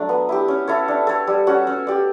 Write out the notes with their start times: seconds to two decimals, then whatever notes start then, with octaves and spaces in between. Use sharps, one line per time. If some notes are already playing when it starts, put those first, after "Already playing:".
Already playing: F#3 A3 D4
0.09 B3
0.29 E4 G4
0.48 C#4
0.68 E4 A4 C#5
0.88 D4
1.07 A4 C#5
1.27 G3
1.47 C#4 F#4
1.67 C#4
1.87 G4 D5